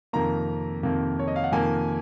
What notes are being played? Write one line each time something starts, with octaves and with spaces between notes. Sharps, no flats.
F2 C3 D#3 A#3 A#5
F2 C3 D#3 A#3
C#5
D#5
F5
F#5
F2 C3 D#3 A#3 G#5